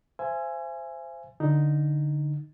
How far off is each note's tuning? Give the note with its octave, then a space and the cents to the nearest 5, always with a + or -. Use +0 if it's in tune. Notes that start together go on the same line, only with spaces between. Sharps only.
C5 -5 E5 +40 G#5 +0
D3 +0 D#4 +0